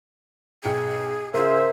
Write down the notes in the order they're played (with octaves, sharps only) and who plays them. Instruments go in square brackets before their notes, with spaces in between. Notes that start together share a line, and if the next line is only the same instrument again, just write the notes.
[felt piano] B1 G5 C#7 [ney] G#4
[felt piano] C#3 F4 [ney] G#4 [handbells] A#4 [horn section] C5 E5